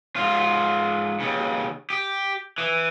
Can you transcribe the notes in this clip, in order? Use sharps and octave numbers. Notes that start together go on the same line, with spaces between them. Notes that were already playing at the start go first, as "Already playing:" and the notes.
G#2 F4
D#2 C#3
G4
E3